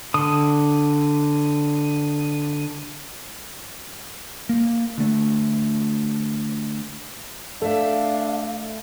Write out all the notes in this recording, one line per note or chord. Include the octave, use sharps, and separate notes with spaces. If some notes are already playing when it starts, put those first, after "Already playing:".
D3 D#6
A#3
D3 A3
A3 D4 A4 E5 F5